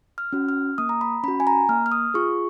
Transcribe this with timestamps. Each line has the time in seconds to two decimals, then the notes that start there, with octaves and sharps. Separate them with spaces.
0.18 F6
0.33 C#4 F#4
0.49 F6
0.78 A#3 D#6
0.89 A#5
1.01 B5
1.23 C#4 F#4 B5
1.40 G#5
1.47 A#5
1.69 A#3 F6
1.86 F6
1.92 D#6
2.14 F4 G#4 C#6